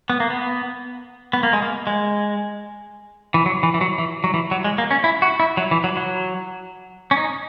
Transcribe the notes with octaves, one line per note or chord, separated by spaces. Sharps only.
B3
A#3
B3
B3
A#3
G#3
A#3
G#3
E3
F#3
E3
E3
F#3
E3
F#3
E3
F#3
G#3
A#3
C#4
E4
F#4
E4
F#3
E3
F#3
F#3
C#4
D#4